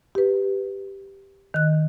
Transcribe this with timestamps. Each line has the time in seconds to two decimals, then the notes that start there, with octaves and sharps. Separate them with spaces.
0.15 G4 B4
1.54 D#3 F#6